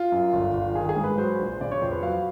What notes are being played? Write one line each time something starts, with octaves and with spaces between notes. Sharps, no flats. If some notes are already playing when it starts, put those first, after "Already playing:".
Already playing: F4
F#2
G1
G1
D#3 G#4
G#4
G#2
B4
F#3 C5
A#1
C#3 D5
C#5
F2 C5
B4
F#3 F5